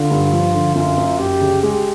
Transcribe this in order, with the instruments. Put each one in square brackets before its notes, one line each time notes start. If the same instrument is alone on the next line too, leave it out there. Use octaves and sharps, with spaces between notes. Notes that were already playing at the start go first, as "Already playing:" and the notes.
Already playing: [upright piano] D3 [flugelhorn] F4
[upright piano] G2
F3
D3
[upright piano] F#2 [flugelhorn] F4
[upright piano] F#2
[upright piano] F#2 [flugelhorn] G4
[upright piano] C#3
[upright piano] G#3 [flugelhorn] G4